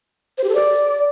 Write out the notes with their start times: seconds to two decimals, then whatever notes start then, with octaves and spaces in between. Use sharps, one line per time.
0.38 C5
0.44 G4
0.49 A4
0.55 D5